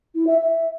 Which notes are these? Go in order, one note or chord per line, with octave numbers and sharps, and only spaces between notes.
E4
E5
E5